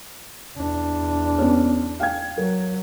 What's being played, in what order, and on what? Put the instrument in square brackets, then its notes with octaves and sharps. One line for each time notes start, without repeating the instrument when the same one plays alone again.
[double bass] E2 D4
[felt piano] B3 C#4
F5 G5 G#6
[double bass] F#3 [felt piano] A#4